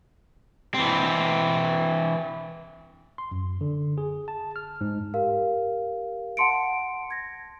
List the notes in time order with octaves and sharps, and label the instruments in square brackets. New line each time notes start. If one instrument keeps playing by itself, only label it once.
[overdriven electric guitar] E3 C4
[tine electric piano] C6
F#2
D3
G#4
A5
F6
G#2
[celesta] G4 A#4 F5
F#5 A5 C6 C#7 D7
G#6 A#6